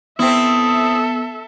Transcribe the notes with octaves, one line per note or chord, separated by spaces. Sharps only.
B3 C4 E4 A4 E5 D#6